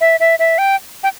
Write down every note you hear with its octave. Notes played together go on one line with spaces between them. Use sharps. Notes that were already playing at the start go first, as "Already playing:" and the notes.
E5
E5
E5
G5
G5